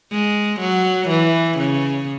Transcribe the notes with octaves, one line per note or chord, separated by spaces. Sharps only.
G#3
F#3
E3
C#3